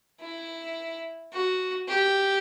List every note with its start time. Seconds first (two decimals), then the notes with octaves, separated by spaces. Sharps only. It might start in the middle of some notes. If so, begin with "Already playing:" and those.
0.20 E4
1.33 F#4
1.88 G4